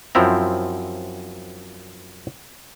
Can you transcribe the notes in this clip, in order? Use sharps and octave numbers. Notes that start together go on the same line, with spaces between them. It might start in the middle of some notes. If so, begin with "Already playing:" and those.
F#2 F3 C4 E4 A#5